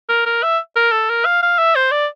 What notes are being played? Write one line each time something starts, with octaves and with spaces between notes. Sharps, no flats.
A#4
A#4
E5
A#4
A4
A#4
F5
F5
E5
C5
D5